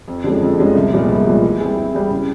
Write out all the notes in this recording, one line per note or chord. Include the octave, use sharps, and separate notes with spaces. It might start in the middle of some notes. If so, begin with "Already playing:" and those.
F2
D3 F3 G#3 C#4
F2
D3 F3 G#3 C#4
C2
A#2 F3 G#3 B3
C2
A#2 F3 G#3 B3
E3
G3 C4 E4 G#4
E3
G3 C4 E4 G#4
C#3